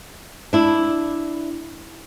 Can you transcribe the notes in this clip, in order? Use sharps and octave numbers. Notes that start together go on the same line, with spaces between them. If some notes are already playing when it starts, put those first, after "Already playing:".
D4 E4